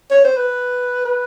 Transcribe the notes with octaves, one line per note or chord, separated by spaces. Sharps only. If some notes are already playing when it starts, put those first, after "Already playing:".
C#5
C5
B4
B4